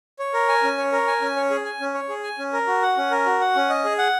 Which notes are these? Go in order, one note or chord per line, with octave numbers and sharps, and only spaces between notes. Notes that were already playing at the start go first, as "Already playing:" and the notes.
C#5
A#4
G#5
C#4
C#5
A#4
G#5
C#4
C#5
G#4
G#5
C#4
C#5
G#4
G#5
C#4
A#4
F#4
F#5
C#4
A#4
F#4
F#5
C#4
D#5
G#4
F#5